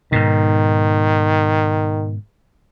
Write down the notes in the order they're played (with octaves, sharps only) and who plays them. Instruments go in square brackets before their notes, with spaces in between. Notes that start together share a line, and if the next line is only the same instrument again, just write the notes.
[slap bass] G#2 B2 [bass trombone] D#3